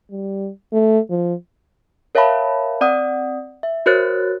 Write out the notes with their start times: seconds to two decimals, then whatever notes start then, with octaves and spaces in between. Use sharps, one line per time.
0.11 G3
0.73 A3
1.10 F3
2.15 A#4 C#5 E5 F5 A5 B5
2.81 C4 D5 F#5 D#6
3.63 E5
3.86 F#4 A#4 C5 C#5 F#6 A6